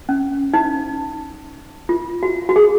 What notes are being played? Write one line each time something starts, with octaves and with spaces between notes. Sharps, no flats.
C#4
D#4
F4
F#4
F#4
G#4